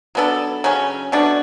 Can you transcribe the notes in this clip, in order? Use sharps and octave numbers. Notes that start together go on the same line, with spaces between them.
F#3 B3 D4 A4
C#3 F#3 C#4
B2 A3 D4 F#4